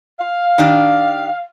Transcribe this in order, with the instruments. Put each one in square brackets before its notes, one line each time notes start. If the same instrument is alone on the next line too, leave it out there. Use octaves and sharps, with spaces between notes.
[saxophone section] F5
[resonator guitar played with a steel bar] D#3 D4 G4